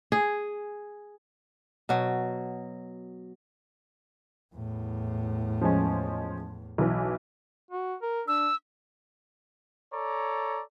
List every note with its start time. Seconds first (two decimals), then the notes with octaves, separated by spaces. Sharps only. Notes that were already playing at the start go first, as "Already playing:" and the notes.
0.12 G#4
1.89 B2 F#3
4.55 E2 A2
5.61 F3 G#3 C#4
6.78 B1 E3
7.71 F#4
8.02 A#4
8.28 D4 E6
9.92 A4 C#5 D5 A#5